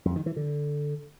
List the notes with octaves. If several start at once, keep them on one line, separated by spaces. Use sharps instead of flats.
F2
D#3
E3
D3